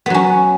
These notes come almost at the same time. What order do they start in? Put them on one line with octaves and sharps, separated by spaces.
B3 F#3 C#4